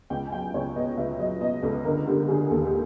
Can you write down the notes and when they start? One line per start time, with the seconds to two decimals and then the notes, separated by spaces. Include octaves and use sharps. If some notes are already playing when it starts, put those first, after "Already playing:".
0.10 C#2 G5
0.27 G#5
0.32 F#3 G5
0.54 C#2 C#5
0.76 B2 D#5
0.97 C#2 E5
1.19 F#3 D#5
1.41 B2 D#5
1.62 C#2 A4
1.85 D3 A#4
2.06 D3 G4
2.28 D3 G#4
2.50 D#2 A4
2.66 G4